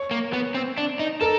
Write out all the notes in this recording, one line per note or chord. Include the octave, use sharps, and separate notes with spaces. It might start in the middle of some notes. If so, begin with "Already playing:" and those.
Already playing: C#5
A#3
B3
C4
D4
D#4
A4 A#4